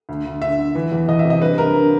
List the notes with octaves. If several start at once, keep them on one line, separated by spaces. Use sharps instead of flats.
D2
D2
D3 E5
D3
E3
E2
E2 D#5
E5
C3
D#5
G2 B4
G2 A#4
D3